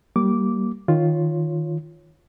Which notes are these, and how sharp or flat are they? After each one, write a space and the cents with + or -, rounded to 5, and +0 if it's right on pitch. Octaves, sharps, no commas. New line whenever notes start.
G3 -20 A#3 +0 D6 -10
D#3 +0 F4 +0 C#5 +0